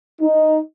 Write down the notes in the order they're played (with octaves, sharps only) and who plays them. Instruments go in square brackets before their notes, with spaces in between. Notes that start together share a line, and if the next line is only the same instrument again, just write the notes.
[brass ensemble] D#4